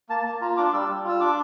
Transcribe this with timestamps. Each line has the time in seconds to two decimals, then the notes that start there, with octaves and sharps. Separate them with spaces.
0.09 A#3 A5
0.26 A#3 A5
0.41 F4 A#5
0.57 D4 D6
0.68 D6
0.73 G3 E6
0.88 G3
1.04 F4 E6
1.20 D4 D6